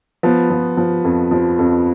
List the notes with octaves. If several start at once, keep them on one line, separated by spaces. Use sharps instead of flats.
F3 B3
F3
F3
F2
F3
F2